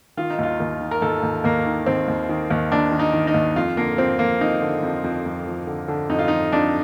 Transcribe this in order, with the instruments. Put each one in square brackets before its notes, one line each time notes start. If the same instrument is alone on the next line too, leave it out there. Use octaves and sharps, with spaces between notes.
[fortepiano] D#3 F4
D#4
D#2 F4
D#2
D#3
A#4
D#2 A4
D#2
D#2 A#3
D#3
D#2 C4
D#2
D#3
D#2
D#2 D4
D#3
D#4
D#3
D#4
D#2
F2 F4
D3 A#3
F2 C4
F3 A#3
F2 D#4
D3
F2
F2
F2
F3
D3
D3
F2 D#4
F4
F3 D#4
F2 D4